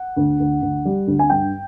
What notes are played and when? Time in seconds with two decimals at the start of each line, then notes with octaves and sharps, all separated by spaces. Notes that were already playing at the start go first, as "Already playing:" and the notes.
Already playing: F#5
0.17 D2
0.40 D2
0.62 D2
0.85 G3
1.07 D2
1.19 G#5
1.30 G2 G5